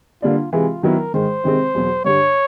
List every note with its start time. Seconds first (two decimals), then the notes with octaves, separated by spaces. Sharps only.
0.22 D3 G3 A#3 D4 F4
0.53 C3 E3 G#3 F4
0.83 D#3 F#3 B3 E4 A#4
1.14 G#2 D#3 G#3 C5
1.44 C3 D#3 G#3 C4
1.75 E2 B2 F#3
2.04 G2 D3 G3 C#5